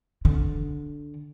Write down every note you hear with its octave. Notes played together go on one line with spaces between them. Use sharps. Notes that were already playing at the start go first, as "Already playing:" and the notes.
D3